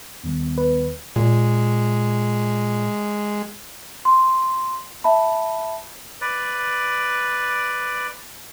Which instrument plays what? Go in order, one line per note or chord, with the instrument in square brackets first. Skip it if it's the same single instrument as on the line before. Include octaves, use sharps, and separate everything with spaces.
[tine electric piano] D#2 D#3 G3 [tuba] B3
[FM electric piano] B4
[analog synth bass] A#2 [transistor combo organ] G#3
[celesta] C6
E5 A5 B5
[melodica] B4 D5